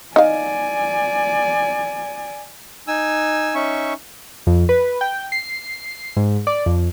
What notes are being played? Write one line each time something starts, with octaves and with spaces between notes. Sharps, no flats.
D#4 D5 F5 G#5
D#4 G#5 E6
C#4 D#4 E5 C#6
F2
B4
G5
C7
G#2
D5
F2